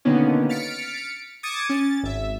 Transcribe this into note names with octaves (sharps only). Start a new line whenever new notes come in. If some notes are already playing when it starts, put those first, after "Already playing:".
B2 D3 D#3 A#3 B3 C#4
F6 A6 B6 C#7 D7
D6 D#6 G#6 A6 C#7 E7
C#4 A6
G#1 E5